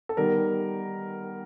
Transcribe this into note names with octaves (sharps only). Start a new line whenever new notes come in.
A4
D#3 G3 B3 D#4 A#4